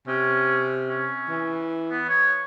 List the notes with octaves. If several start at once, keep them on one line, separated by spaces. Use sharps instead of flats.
C3 C#4
C#4
E3
B3
C#5